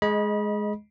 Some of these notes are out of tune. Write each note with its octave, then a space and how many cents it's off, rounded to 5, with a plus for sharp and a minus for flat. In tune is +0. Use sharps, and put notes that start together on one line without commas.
G#3 +15 D#5 +0 B5 -30